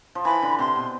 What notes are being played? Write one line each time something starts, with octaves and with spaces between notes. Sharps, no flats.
F3
E3 B5
D3
C3 C6
B2